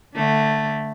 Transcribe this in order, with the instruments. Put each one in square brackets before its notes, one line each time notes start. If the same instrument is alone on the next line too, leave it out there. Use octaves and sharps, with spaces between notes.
[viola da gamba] D3 A3